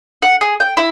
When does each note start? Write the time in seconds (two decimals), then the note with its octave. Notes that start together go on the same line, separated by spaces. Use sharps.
0.22 F#5
0.41 G#4
0.60 G5
0.77 E4